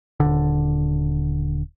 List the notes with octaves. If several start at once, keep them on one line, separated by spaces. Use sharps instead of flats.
D#1 G#1 D3